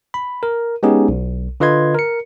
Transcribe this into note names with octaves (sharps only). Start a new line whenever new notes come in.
B5
A#4
G#3 B3 C#4 D#4 G4 G#4
B1
D3 F4 B4 D#5 C6 G#6
A#4 C#7